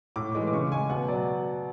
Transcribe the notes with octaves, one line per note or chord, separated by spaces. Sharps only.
A2 D6
E3 G#3
D6
C#3 C#6
G#3 G#5
B2 F#5
F#3 D5